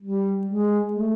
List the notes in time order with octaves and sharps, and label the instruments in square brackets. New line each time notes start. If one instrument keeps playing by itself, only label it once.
[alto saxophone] G3
G#3
A3